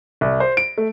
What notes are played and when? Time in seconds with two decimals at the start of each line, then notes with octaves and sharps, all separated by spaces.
0.21 C2
0.40 C5
0.57 D7
0.78 A3